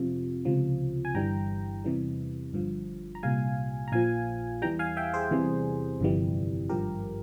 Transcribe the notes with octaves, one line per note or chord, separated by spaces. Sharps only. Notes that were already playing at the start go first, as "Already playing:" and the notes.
Already playing: F2 C3 F3
C#2 C3 F3
G#5
G1 G2 E3 G3 G5 A#5
E2 C3 E3 G3
G1 G2 F3
A#5
C2 A#2 G3 F5 G#5
A#5
A#1 A#2 F3 F5 G#5
E2 E3 G3 G5 A#5
F5 G#5
E5 G5
G#4 C5
E2 C3 E3 G3
G1 F2 C3 E3 G3
G#1 G2 F3 G4 A#4